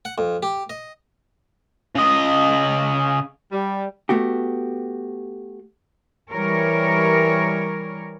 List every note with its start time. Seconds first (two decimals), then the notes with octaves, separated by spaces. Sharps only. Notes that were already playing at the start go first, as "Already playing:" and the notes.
0.05 F#5
0.18 F2
0.43 G4
0.70 D#5
1.95 C#3 D#5
3.52 G3
4.09 A3 B3 F#4 G4
6.31 E3 G3 A#4 C#5